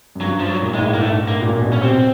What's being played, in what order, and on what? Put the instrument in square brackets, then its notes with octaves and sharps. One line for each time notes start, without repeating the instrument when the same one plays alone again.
[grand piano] F#2
[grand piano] G2 [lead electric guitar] F#3
[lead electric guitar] F3
F#3
[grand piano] A#2
A2
[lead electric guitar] G#3
[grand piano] G#2
A2
[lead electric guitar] A#3
[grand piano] G#2 [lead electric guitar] A3
[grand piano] A2
[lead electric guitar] A#3
[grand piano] A#2
A#2
B2
[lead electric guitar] C#4
[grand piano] C3 [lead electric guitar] C4